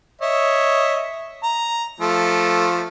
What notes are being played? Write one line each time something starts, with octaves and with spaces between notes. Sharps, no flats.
C#5 D#5 E5
A#5
F3 A3